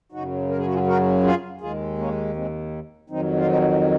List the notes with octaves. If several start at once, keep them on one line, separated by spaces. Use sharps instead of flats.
F#2 C#3 F#3 D#4 F#4
A#4
G#4
F#4
F4 G#4
F#4 A#4
F4 G#4
D#2 D#3 G#3 F4 G#4
A#3 C#4
G#3 C4
F2 D#3 F#3 C4 D#4
F4
C4 D#4